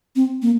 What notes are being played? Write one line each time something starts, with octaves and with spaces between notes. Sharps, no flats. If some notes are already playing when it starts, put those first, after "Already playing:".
C4
A#3